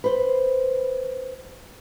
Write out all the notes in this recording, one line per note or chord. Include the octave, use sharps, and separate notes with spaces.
B4 C5